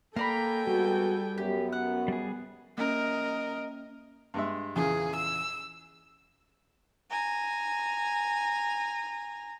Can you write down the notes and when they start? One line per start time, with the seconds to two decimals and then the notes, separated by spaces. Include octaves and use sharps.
0.16 A#3 A4 A#4 D5 G5 G#5 A#5 B5
0.67 G3 G#3 B3 F#4
1.38 F#2 B3 G4
1.72 F#5
2.08 G3 G#4
2.78 A#3 C#4 A#4 D#5
4.34 G2 G#3 E5
4.76 E2 A#2 C#3 G#4
5.16 E6
7.10 G#5 A#5